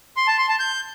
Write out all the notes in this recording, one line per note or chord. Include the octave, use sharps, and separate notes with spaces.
C6
A5
C6
A5
G6